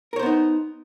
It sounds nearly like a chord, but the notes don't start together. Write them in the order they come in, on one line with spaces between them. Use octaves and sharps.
A#4 C#5 C5 B3 D#4